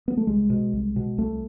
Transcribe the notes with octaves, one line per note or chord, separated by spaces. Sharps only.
B3
A3
C2 G#3
B2
C2
B2
C2 A3